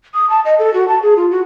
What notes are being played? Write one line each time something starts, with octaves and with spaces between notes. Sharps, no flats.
D#6
A5
D#5
A4
F#4
A5
G#4
F4
F#4